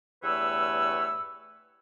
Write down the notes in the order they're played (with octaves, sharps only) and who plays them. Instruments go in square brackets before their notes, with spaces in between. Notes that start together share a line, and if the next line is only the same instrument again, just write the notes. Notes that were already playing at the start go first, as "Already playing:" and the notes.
[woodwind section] E2 G2 A3 B4 C#5 E6